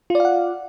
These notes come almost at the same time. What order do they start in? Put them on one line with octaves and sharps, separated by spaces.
F4 D5 F5 F#5